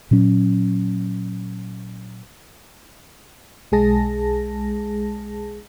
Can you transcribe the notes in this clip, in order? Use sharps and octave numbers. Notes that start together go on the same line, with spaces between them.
A#2 F#3 C#4
B1 G#3 G#4 A5 A#6